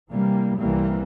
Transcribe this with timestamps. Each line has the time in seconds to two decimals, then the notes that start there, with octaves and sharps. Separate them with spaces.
0.12 C3 E3 G3 A#3
0.60 C2 E3 G3 A#3 C4